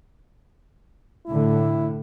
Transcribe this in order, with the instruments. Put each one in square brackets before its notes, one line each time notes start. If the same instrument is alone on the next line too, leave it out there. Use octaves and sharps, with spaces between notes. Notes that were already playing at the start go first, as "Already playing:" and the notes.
[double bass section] A2 D3 [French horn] E4